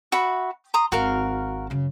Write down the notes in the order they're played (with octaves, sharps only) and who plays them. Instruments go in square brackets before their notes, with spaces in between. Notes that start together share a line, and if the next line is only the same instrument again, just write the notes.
[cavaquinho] F#4 E5 B5
A#5 C6 D#6
[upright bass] G#1 [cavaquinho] F#4 A#4 F5
[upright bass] F#2 C#3